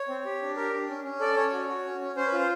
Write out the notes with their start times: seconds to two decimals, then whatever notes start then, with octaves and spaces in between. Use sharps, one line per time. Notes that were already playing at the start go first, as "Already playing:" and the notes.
Already playing: C#5
0.09 C4
0.25 G4
0.42 D4
0.56 G4 A#4
0.74 D4
0.89 C#4
1.04 C#4
1.20 A4 D5
1.36 C#4 C#5
1.52 F#4
1.69 F#4
1.85 C#4
2.01 C#4
2.16 C#4 C5
2.27 B4
2.33 F4
2.38 C5